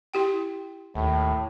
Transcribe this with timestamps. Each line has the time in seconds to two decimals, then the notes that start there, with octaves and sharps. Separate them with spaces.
0.14 E4 G4 G5
0.95 D#2 A2